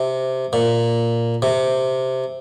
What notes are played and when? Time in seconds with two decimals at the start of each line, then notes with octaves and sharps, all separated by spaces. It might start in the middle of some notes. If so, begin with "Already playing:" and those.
Already playing: C3
0.53 A#2
1.42 C3